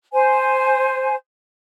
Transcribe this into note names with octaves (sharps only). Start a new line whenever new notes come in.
C5 G#5